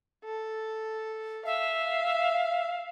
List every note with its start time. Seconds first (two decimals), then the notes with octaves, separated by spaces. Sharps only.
0.24 A4
1.45 E5 F5